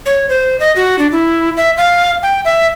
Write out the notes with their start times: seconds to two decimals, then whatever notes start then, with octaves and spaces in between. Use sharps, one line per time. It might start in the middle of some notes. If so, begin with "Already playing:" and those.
0.06 C#5
0.29 C5
0.60 D#5
0.76 F#4
0.99 D4
1.12 E4
1.57 E5
1.77 F5
2.23 G5
2.45 E5